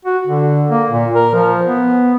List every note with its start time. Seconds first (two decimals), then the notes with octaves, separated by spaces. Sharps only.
0.05 F#4
0.27 D3
0.71 A#3
0.90 A#2
1.15 A#4
1.34 F3
1.65 B3